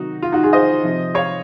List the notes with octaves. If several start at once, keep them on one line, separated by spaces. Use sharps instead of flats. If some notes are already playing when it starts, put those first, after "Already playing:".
Already playing: C3 D#3 F#3 D#4 F#4
F4
D#4 F#4
F4 G#4
C5 D#5
C3 F3
C#5 F5